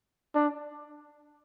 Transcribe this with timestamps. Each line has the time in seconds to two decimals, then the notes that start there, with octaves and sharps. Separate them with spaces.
0.35 D4